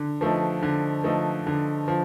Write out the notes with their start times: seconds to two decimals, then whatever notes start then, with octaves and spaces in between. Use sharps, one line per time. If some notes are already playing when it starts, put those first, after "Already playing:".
Already playing: D3
0.21 F3 A3 D#4
0.63 D3
1.04 F3 A3 D#4
1.47 D3
1.88 F3